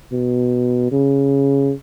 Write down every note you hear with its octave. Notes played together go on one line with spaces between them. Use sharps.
B2
C#3